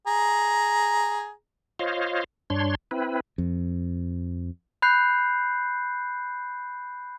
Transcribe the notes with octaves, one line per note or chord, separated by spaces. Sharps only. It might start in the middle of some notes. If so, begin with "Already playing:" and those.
G#4 A#5
F4 C5 C#5 D#5 F5
G2 D4 C#5 C6
C4 E4 B4
F2
B5 F#6 G6 C7